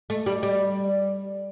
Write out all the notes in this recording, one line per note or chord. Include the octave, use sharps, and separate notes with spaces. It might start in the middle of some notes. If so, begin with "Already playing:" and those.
A3
G3
G3